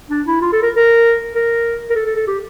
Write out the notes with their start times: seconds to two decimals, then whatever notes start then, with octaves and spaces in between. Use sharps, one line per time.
0.10 D4
0.27 E4
0.41 F4
0.53 A4
0.62 A#4
0.76 A#4
1.35 A#4
1.90 A#4
1.95 A4
2.06 A4
2.16 A4
2.27 G4